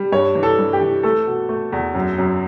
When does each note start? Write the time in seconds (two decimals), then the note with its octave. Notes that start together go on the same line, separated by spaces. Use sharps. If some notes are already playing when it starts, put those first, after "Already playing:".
Already playing: G3
0.12 G2 C#5
0.35 E3
0.43 A4
0.59 G2
0.73 G4
0.81 E3
1.03 A3 A4
1.27 B2
1.49 A3
1.73 E2
1.95 F#2
2.18 F#2